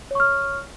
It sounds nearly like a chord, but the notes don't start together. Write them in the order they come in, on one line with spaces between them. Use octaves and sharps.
C#5 C#6 F6